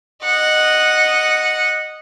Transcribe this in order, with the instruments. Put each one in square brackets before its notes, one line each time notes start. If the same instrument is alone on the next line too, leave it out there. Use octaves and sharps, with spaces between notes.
[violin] D#5 F#5